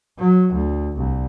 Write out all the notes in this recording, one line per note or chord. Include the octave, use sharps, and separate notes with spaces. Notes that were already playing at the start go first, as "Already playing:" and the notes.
F#3
D2
C2